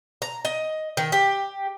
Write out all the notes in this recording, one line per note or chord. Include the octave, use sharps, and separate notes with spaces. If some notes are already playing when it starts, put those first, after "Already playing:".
A#5
D#5
D#3
G4